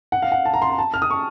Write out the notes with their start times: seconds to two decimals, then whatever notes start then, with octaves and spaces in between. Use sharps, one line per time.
0.12 F#5
0.22 F5
0.32 F#5
0.45 A5
0.54 A#5
0.62 C6
0.70 A#5
0.78 A5
0.94 F6
1.02 D#6
1.10 C#6